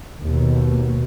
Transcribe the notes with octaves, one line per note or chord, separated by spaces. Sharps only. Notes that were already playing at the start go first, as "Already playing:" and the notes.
D#2 B2